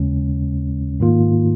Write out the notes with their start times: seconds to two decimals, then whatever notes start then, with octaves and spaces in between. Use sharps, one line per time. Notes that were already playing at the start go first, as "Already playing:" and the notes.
Already playing: D#2 C#3 G#3 C#4
1.00 G#2 D#3 A#3 F4